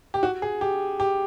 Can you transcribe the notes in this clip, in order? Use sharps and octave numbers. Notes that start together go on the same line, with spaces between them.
G4
F#4
G#4
G4
G4